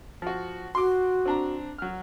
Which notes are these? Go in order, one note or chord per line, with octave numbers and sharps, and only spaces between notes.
F3 F#4
F#4 C6 D6
C4 D4 A#5
F#3 F6